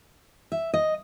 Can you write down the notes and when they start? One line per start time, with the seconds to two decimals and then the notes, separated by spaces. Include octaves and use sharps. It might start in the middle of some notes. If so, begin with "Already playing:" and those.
0.52 E5
0.74 D#5